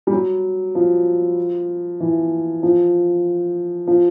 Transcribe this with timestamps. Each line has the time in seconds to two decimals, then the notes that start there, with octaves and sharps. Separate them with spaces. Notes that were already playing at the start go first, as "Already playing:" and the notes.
0.07 G3
0.13 F#3
0.75 F3
2.00 E3
2.63 F3
3.87 F3